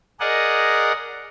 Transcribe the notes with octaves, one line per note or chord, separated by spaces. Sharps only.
G#4 A#4 D5 D#5 F#5